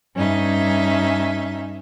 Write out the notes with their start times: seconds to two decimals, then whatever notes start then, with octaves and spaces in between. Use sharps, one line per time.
0.16 G2 C#4 D#4 E5